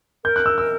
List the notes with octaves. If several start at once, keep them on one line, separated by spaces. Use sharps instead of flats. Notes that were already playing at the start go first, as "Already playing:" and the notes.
A#4 G6
F#6
E6
E6